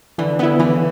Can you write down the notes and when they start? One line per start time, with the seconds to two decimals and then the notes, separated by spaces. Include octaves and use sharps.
0.18 D3 E3
0.39 D3 B3 E4
0.59 C#3 E3